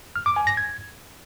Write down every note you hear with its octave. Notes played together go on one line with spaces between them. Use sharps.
F6
D6
G#5
A#6
G#6